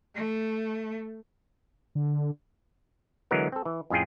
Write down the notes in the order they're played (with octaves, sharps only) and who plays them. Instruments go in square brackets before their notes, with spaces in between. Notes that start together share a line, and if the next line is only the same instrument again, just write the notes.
[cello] A3
[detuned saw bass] D3
[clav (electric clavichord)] D3 E3 F#3 G#3 B3 A#4
C4 A4
E3
F2 A2 C#4 F4 G#4 G5